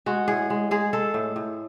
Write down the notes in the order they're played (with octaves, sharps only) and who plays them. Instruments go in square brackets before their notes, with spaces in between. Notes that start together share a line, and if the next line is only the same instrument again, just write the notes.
[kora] G#3 F#4
A2 G#4
G#3
G#3 G#4
G#3 A4
A2
A2